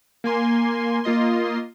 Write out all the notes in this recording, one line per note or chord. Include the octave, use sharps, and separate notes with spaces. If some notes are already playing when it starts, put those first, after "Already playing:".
A#3 G#5 C6
A#3 F4 D#5 C6